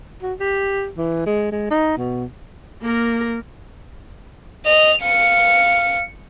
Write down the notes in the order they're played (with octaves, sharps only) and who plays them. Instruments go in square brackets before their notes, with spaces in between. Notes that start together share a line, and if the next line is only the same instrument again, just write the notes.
[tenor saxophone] F#4
G4
E3
G#3
G#3
D#4
B2
[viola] A#3 A#4
[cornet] D#5 [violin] F7
[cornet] F5 [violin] C#7